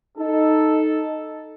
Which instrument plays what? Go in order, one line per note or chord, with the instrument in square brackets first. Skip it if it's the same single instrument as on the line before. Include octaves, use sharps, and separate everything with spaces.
[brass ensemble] D#4 A4